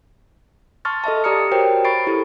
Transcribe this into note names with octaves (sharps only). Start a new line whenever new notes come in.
A5 C6 C#6 F6 A6
A4 D#5 E5 A5
G4 D5 A#5 D#6 F6 C#7
F#4 A#4 C5 C#5 G5
B5 C#6 A6 C7 D7
E4 G4 A4